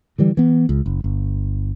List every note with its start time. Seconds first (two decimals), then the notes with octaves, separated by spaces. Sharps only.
0.18 D3 E3 G3
0.37 E3 B3
0.69 C#2
0.86 F#1
1.04 G1